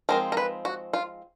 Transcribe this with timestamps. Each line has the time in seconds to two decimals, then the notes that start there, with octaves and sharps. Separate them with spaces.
0.09 F3 G#3 C4 D#4 A#4
0.32 A#4
0.37 B4
0.65 F#4
0.93 F4